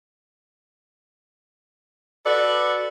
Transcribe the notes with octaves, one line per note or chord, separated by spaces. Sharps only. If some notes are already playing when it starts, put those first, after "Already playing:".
F#4 A4 B4 D5